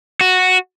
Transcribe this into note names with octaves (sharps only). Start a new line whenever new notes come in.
F#4